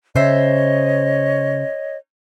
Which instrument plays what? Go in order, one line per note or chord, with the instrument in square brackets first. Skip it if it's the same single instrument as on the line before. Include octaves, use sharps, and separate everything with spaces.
[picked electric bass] C#3 [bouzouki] C5 E5 [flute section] C#5 D#5